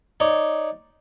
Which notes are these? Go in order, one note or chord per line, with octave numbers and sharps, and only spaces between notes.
D#4 C#5 D5